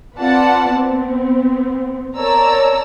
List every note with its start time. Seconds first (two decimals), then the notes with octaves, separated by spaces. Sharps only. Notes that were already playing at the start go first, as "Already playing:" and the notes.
0.17 C4 F4 B4 D5 F#5 A5
0.71 B3 C4
2.17 A#4 C#5 D5 A5 A#5 E6